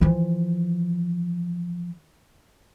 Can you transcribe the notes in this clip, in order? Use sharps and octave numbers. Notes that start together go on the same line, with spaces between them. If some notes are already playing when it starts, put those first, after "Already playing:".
E3 F3